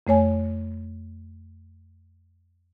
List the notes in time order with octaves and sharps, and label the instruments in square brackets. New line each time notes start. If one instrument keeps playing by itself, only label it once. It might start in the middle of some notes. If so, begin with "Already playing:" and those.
[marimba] F2 A3 C#5 G#5